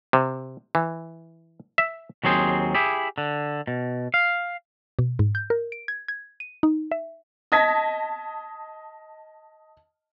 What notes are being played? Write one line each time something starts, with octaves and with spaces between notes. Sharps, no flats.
C3
E3
E5
D#2 F#3 C4 G#4 C5
E4 G4 G#4
D3
B2
F5
B2
G#2
G6
A#4
D7
G#6
G#6
D#7
D#4
E5
D#5 A5 G#6 A#6 B6